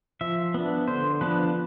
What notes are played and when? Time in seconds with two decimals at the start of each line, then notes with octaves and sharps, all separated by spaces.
0.21 F3 E5
0.54 B3 D4
0.88 D3 C5
1.21 F3 B3 D4 B4